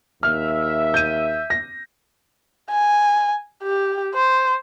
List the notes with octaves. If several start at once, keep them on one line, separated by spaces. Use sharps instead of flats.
D#2 E5 F6
G6 D#7
A#6
G#5
G4
C5